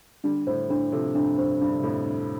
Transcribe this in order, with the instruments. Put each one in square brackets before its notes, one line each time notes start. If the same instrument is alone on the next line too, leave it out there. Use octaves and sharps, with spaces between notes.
[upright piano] D3 G3 [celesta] D4
[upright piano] A2 D3 [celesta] C5
[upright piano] A2 D3 [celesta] D4
[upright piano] C3 F3 [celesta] A4
[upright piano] G2 C3 [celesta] D4
[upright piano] G2 [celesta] C5
[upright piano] G2 [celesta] D4
[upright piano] D3
C3
[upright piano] F2 A2 [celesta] A4
[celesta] D4